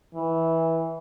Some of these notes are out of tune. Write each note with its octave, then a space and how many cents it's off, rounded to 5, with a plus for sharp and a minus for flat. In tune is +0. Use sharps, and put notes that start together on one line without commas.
E3 -10